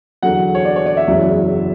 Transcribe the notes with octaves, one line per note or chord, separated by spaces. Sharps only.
E2 D3 F#3 F#5
C#5
D5
C#5
D5
E5
F#1 E2 C#3 F#3